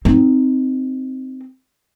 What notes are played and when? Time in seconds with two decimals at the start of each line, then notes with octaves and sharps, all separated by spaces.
0.05 C4 D#4